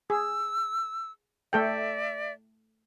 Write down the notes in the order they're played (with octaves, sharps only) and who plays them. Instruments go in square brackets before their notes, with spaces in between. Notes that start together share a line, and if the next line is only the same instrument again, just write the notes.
[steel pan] G#4 [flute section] E6
[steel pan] A3 A4 G5 [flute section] D5 E5